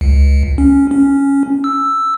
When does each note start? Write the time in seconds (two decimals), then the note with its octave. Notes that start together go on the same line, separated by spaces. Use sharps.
0.01 C#2
0.58 C#4
0.91 C#4
1.64 E6